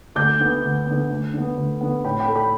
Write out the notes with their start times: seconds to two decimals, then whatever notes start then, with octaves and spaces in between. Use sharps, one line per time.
0.15 D2 D6 G6
0.40 D3 B3
0.63 D2
0.86 D3 B3
1.10 D2
1.33 D3 B3
1.57 D2
1.81 D3 B3
2.04 A2 G5 B5
2.20 G5 B5
2.28 A3
2.35 G5 B5